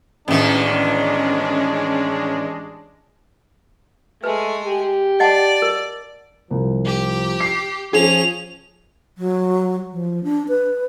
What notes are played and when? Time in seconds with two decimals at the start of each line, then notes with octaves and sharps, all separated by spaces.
0.28 A1 E2 D#3 G#3 C#4 D4
4.24 G#3 A3 B4 G#5
4.65 G4
5.20 D5 D#5 F#5 A5
5.62 A#4
6.51 C2 F3
6.85 G4
7.40 C7
7.93 F3 C#4 G#4 F7
9.18 F#3
9.93 F3
10.24 D4
10.48 B4